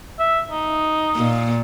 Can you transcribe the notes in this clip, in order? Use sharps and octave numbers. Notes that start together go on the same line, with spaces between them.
E5
D#4
A#2